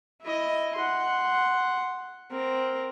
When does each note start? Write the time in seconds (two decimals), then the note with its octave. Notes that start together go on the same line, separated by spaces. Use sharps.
0.22 E4 D#5
0.75 F#5 C6
2.31 C4 A#4